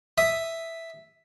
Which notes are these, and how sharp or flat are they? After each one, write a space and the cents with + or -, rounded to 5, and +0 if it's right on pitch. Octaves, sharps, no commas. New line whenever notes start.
E5 +0 D#6 +0